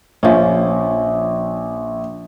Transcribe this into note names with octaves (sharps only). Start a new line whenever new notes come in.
A#1 F3 C#4